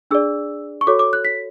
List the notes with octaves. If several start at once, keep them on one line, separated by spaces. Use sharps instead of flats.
D4 G#4 D5 E6
C#6
F#4 A4 C#5 D6
D6
F#6
B6